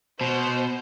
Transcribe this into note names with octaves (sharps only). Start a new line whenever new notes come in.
B2 C5